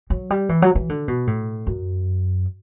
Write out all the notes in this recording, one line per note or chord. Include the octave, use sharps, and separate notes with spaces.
F#3
G3
E3
F#3
E3
D3
B2
A2
F#2